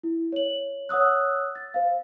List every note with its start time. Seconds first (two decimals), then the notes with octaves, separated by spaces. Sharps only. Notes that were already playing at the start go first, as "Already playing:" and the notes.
0.03 E4
0.33 C#5 F#7
0.89 C#5 F#5 D#6 E6 F#6
1.55 A6
1.74 C5 F5